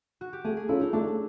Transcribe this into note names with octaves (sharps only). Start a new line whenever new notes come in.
F#4
G4
A3 G#4
G#4
C#4 E4 F4 A4
D#4
A3 D4